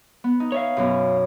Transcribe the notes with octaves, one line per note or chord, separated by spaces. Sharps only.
B3
D#4
C#5 E5 F5
F#2 B2